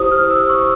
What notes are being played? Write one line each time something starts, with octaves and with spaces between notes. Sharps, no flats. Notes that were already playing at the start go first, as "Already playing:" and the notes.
Already playing: E4 G4 C5 D#6
F6
E6
C#6